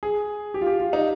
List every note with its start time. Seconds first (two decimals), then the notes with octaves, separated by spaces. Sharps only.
0.03 G#4
0.54 G4
0.61 F4
0.67 G4
0.80 F4
0.93 D#4